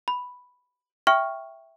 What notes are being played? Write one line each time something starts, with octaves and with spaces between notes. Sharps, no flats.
B5
E5 G5 C#6 F6